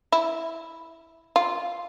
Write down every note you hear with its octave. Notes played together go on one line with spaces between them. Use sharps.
E4
F4